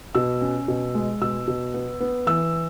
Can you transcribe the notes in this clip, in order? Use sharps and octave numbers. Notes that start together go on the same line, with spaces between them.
B2 E6
C#4
B2
G#3
B2 E6
B2
B3
B3
E3 E6